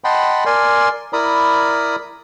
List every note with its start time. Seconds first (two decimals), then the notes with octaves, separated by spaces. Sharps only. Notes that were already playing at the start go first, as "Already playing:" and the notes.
0.04 D#5 F#5 G5 A5 B5 C6
0.46 A#4 D5 G#5 C6
1.13 E4 A#4 D5 A#5 B5 D#6